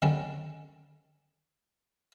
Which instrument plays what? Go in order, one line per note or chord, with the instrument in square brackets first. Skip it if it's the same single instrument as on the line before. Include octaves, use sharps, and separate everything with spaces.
[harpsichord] D3 D#3 G3 C#4 D4